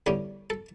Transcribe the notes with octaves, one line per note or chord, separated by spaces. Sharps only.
E2 D3 G3 C#4 G4
A4